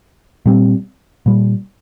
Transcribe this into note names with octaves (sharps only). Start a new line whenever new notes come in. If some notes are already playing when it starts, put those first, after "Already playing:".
A#2 G3 C4
A#2 G3